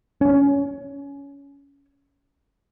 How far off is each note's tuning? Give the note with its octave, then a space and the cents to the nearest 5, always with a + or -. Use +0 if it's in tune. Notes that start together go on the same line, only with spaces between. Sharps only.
C#4 +20